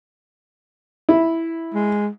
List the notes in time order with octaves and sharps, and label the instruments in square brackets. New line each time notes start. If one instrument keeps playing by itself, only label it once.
[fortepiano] E4
[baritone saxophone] G#3